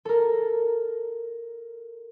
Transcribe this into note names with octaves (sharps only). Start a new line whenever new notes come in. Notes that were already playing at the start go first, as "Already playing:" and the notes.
A4 A#4